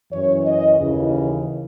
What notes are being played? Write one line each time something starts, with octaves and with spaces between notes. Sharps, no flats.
F#2 E3 C#5
D#5
D#2 C#3 E3